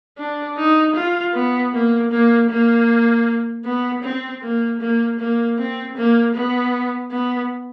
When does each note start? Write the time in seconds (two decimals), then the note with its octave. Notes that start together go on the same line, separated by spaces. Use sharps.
0.18 D4
0.57 D#4
0.95 F4
1.34 B3
1.73 A#3
2.11 A#3
2.50 A#3
3.65 B3
4.04 C4
4.43 A#3
4.81 A#3
5.19 A#3
5.58 C4
5.97 A#3
6.35 B3
7.12 B3